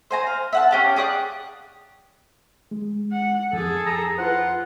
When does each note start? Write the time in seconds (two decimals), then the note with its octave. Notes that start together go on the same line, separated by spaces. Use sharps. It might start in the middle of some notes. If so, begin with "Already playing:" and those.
0.11 C5 G#5 A#5
0.27 F5
0.53 E5 F#5 A5
0.71 C#4 G4 F5
0.96 G#4 D5 D#6 F#6
2.71 G#3
3.12 F#5
3.53 F2 G#4 A4
3.86 A#5
4.18 F4 B4 C5 F#5